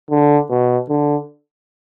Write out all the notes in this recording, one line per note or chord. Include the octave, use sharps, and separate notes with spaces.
D3
B2
D3